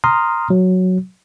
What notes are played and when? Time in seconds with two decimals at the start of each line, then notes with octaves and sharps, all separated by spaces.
0.04 A#5 C6 D#6 F6
0.50 F#3